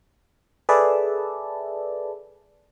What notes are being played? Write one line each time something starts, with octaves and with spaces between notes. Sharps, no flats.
G#4 A4 B4 D5 E5 A5